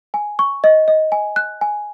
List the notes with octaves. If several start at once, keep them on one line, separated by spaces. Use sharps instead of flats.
G#5
C#6
D#5
D#5
G#5
F#6
G#5